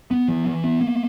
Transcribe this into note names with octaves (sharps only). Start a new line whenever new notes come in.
B3
E3
E3
B3
A#3